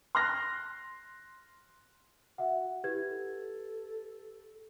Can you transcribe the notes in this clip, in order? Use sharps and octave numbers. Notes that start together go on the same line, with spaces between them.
C6 F6 F#6 A#6
F#4 E5 F#5
E4 G4 B4 G#6
A4